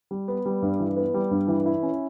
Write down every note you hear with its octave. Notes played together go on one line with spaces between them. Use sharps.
G3
B3
G3
G2
E3
B3
G3
G2
E3
E4
C#4